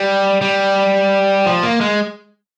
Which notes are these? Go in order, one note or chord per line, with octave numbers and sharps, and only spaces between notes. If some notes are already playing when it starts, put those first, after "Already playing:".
Already playing: G3
G3
F3
A#3
G#3